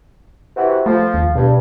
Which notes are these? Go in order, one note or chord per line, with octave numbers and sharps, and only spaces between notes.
C3 E3 F#4
F3 A3
D#2
G2 B2